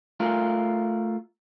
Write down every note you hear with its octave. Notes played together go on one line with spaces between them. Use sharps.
A3 F4 A#4